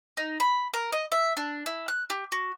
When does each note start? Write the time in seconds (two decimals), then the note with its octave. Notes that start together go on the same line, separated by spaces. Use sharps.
0.17 D#4
0.40 B5
0.74 A#4
0.92 D#5
1.12 E5
1.37 D4
1.66 E4
1.88 F#6
2.10 G4
2.32 F#4